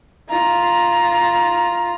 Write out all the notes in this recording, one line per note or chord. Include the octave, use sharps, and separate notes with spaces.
F4 A#5